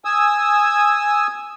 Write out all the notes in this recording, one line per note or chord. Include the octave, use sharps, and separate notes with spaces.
G#5 D#6 E6